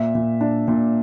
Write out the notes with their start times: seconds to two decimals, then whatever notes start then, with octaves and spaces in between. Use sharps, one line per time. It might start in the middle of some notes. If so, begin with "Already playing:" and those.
Already playing: A#2 E5
0.15 A#2
0.41 D4
0.68 A#2